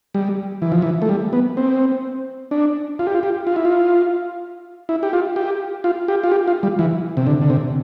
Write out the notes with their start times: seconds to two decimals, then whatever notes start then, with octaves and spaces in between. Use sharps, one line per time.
0.14 G3
0.62 E3
0.72 F3
0.82 E3
1.02 A3
1.09 G3
1.33 B3
1.57 C4
2.51 D4
2.99 F4
3.07 G4
3.15 F4
3.23 G4
3.47 F4
3.56 E4
3.65 F4
4.89 E4
5.03 G4
5.13 F4
5.36 G4
5.84 F4
6.08 G4
6.24 F4
6.32 G4
6.48 F4
6.63 G3
6.79 E3
7.17 C3
7.27 D3
7.41 D3
7.50 C3